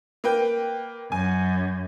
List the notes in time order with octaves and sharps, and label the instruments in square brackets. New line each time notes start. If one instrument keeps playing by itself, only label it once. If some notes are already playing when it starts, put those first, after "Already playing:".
[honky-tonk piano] A#3 B4 G5
[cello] F#2 [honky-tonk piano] G#5